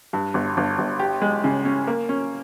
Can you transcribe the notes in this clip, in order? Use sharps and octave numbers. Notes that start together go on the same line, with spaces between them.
G2
G1
G1
G1
G4
G#3
C#3
C#4
A#3
C#4